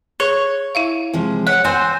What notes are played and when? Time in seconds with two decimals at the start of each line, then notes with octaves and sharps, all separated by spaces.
0.20 G#4 C#5
0.75 E4 E5 F5
1.13 C3 F3 G#3
1.47 C#5 F#5 F#6
1.65 C4 C5 G#5